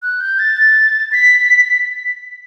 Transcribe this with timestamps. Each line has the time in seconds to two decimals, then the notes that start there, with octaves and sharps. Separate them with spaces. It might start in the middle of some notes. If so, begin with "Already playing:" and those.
0.02 F#6
0.20 G6
0.39 A6
1.12 B6